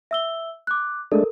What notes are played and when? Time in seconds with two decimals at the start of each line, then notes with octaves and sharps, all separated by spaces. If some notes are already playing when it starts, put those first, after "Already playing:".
0.11 E5 E6 G7
0.67 D6 F#6
1.12 G#3 A3 D4 A4 A#4